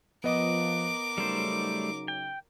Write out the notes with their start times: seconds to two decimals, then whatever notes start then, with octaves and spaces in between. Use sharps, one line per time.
0.24 F3 B3 A#4 D#5 D6
1.18 C#3 F#3 G3 A3 D#4 C5
2.08 G5